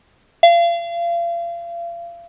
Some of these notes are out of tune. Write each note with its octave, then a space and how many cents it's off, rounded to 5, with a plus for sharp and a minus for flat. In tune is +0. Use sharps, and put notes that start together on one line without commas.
F5 -35